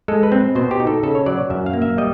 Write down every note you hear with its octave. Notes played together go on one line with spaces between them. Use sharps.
G#3 A4
B4
C4
B2 C5
G4
D#4
A4
C#3 A4
C#5
F#3 D5
F#2 E5
F5
A#3
E5
G3 D#5